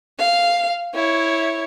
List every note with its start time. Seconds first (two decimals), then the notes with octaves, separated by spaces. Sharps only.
0.19 F5
0.94 E4 C#5